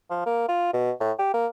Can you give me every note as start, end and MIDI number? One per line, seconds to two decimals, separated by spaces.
0.10 0.25 53
0.26 0.47 58
0.48 0.69 65
0.73 0.91 47
1.00 1.12 45
1.19 1.31 67
1.34 1.47 58